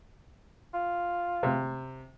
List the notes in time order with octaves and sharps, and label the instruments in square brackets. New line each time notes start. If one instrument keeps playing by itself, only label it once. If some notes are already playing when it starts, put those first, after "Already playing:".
[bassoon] F4
[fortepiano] C3